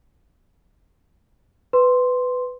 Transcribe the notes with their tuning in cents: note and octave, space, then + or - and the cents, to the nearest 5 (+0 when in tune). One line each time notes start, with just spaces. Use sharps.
B4 +15 C6 +0